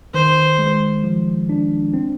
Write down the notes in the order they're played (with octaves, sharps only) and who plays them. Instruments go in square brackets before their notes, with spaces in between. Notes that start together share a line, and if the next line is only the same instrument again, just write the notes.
[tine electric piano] D#3 [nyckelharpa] C5
[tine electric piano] G#3
F3
D4
C4